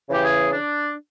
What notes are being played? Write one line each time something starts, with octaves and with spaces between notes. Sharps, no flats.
C#3 E3 G4
G#4
D4